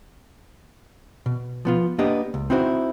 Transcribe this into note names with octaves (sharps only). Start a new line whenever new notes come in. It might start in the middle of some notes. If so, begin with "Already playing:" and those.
B2
F3 B3 F4
A#3 B3 D4 G4 D#5
C#2
C4 D#4 E4 F#4 A4 C5